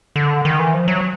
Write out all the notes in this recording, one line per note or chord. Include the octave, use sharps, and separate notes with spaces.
D3
D#3
E3
F3
F#3